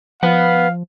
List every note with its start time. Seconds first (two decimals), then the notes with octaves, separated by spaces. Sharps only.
0.23 F3 B4 F5 F#5